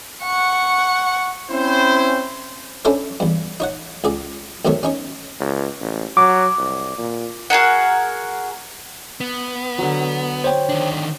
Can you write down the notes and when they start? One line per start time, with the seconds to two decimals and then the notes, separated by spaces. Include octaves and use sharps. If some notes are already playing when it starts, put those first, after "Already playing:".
0.23 F#5 C#6
1.51 C4 C#4 E4 C5
2.85 C#4 D4 E4 A4 C5 C#5
3.20 E2 G2
3.60 D#4 C#5 F#5
4.04 C#2 G#4 D5
4.65 B1 C3 D#3 A3 C#5
4.83 C#4 D#4 C#5
5.40 C#2
5.81 A1
6.17 F#3 D6
6.58 C2
6.97 A#2
7.50 F#4 G#4 A#4 F#5
9.20 B3
9.79 D3 F#3
10.44 C5 C#5 G5
10.69 D#3 D4